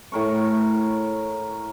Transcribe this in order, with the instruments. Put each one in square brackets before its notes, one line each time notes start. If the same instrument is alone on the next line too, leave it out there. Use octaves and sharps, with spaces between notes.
[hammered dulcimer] A2 A#4 C#6